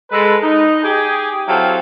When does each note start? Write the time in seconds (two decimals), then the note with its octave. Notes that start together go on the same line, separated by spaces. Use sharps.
0.11 G#3 A4 B4
0.43 D#4
0.84 G4 G#4
1.48 F#3 C4 E4 G4 A4 F5